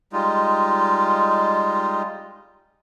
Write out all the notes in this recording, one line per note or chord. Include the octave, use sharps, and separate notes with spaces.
G3 G#3 D#4 F4